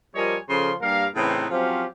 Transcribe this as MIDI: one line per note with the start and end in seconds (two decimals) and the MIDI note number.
0.15 0.37 53
0.15 0.37 55
0.15 0.37 70
0.15 0.37 73
0.15 0.37 75
0.15 0.37 80
0.49 0.72 49
0.49 0.72 53
0.49 0.72 69
0.49 0.72 84
0.81 1.06 43
0.81 1.06 55
0.81 1.06 58
0.81 1.06 70
0.81 1.06 77
1.15 1.46 45
1.15 1.46 49
1.15 1.46 52
1.15 1.46 59
1.15 1.46 60
1.15 1.46 63
1.51 1.85 53
1.51 1.85 54
1.51 1.85 60
1.51 1.85 61
1.51 1.85 67
1.51 1.85 77